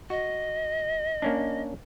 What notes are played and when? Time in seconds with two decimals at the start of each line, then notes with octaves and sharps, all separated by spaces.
0.10 F#4 D#5
1.22 A#3 C#4 D4